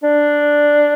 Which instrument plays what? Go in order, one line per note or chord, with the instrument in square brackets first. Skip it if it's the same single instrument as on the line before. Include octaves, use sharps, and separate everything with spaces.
[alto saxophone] D4